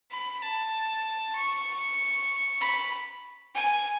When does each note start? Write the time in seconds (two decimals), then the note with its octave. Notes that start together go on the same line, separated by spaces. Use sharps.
0.11 B5
0.42 A5
1.35 C#6
2.61 B5
3.55 G#5